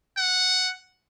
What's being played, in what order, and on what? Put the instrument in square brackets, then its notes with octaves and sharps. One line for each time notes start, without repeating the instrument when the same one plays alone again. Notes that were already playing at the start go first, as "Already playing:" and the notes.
[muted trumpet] F#5